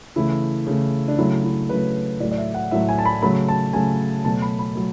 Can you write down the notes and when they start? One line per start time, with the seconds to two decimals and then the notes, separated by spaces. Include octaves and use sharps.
0.16 C#3 E3 A3 E4
0.67 C#3 E3 A3
1.08 D4
1.18 C#3 F#3 A3 E4
1.44 E4
1.69 C#3 F#3 A3 B4
2.20 A2 F#3 A3 D5
2.31 D5
2.37 E5
2.54 F#5
2.71 A2 F#3 A3 E5
2.88 G#5
2.99 A5
3.05 B5
3.22 C#3 F#3 A3 B5
3.49 A5
3.73 C#3 F#3 A3 G#5
4.25 B2 F#3 A3 A5
4.42 B5
4.59 B5
4.75 F#3 A3